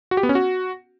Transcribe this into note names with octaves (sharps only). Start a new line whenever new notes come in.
F#4
G4
B3
C#4
F#4